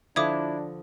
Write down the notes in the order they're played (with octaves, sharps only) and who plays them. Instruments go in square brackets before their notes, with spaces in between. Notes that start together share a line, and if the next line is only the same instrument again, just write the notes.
[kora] D3 F3 D#5 [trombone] D4 [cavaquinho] E4 [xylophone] D6 D#6 G#6